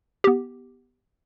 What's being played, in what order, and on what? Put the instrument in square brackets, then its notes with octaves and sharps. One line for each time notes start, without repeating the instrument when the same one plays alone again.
[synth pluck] B3 G4